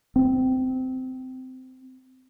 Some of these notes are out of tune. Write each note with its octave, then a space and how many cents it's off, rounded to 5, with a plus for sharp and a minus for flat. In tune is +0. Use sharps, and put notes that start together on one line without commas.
C4 -20